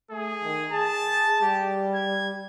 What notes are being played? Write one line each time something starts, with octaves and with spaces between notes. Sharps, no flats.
A3 G#4
D#3
G#4 A5
G3 G4
G#6